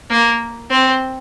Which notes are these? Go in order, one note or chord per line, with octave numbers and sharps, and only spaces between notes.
A#3
C4